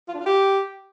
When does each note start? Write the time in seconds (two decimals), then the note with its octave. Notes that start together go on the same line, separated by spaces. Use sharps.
0.08 F4
0.14 D4
0.20 F4
0.26 G4